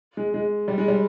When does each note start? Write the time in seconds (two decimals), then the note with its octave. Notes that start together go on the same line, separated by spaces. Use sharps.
0.17 G#3
0.34 G#3
0.68 G3
0.78 G#3
0.88 G3